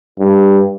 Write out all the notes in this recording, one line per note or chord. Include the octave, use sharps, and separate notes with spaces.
G2